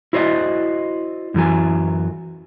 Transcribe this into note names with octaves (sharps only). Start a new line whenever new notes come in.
E4 F#4 C5 D5 D#5
F#2 E3 F#3 G#5